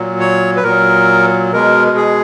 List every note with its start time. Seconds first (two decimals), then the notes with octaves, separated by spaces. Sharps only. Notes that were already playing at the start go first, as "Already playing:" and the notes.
Already playing: A#2 F#3
0.20 C#5
0.56 B4
0.64 A#2 F#3 A#4
1.52 B2 G#3 A#4
1.97 G#4